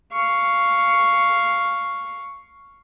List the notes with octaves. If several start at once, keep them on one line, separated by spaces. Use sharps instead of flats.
F5 C#6